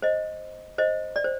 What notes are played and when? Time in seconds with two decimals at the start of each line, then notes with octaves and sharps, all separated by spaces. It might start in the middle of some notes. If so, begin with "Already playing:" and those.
0.02 C5 D#5
0.78 C5 D#5
1.16 D5
1.24 C5